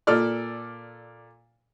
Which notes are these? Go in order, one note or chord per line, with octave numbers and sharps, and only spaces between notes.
A#2 A4 D5 F6